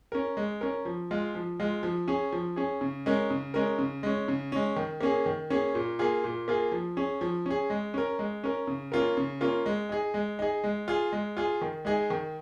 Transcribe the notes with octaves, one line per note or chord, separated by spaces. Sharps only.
C#4 A#4
G#3
C#4 A#4
F3
G#3 F4
F3
G#3 F4
F3
C#4 G#4
F3
C#4 G#4
C#3
G#3 C#4 A#4
C#3
G#3 C#4 A#4
C#3
G#3 C#4
C#3
G#3 C#4
D#3
A#3 C#4 G#4
D#3
A#3 C#4 G#4
A#2
A#3 F4 G#4
A#2
A#3 F4 G#4
F3
C#4 G#4
F3
C#4 G#4
G#3
C#4 A#4
G#3
C#4 A#4
C#3
A#3 C#4 F4 A#4
C#3
A#3 C#4 F4 A#4
G#3
D#4 G#4
G#3
D#4 G#4
G#3
F4 G#4
G#3
F4 G#4
D#3
G#3 D#4 G#4
D#3